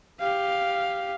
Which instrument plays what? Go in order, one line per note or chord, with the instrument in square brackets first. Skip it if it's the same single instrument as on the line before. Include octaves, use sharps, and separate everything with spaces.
[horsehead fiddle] G4 F5